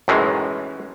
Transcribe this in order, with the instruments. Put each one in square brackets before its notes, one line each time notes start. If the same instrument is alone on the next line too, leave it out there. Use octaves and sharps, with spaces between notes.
[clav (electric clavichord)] F#2 A2 D#3 E3 G#3